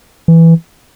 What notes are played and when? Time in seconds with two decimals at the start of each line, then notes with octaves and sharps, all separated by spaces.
0.28 E3